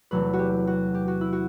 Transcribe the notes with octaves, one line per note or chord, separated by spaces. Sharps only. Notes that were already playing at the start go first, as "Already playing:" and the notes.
E2 C3 F#3 A3 B4
F#4
G4
F#4
G4
F#4
E4
F#4